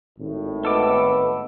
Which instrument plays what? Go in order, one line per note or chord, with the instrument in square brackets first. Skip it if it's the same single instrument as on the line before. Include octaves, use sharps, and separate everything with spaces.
[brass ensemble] G#1 A2
[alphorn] B3 [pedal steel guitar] A4 D6 [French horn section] D#5